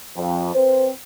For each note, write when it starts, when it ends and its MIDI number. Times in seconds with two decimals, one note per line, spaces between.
0.16 0.52 41
0.54 0.88 60
0.54 0.88 71
0.54 0.88 72